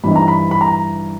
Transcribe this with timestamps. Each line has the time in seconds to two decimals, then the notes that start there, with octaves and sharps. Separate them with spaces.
0.04 G2 E3 G3 C4 D#4 B5
0.16 A#5
0.28 B5
0.51 B5
0.61 A#5